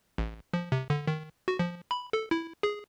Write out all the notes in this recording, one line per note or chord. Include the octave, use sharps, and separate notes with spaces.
A1
F3
C3
D3
D#3
F#4
F3
B5
A4
E4
G#4